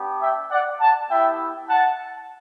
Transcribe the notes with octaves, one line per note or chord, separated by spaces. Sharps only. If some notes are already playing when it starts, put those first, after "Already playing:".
Already playing: B3 D4 G4
E5 G5
D5 F#5
F#5 A5
B3 E4 G4 E5 G5
F#5 A5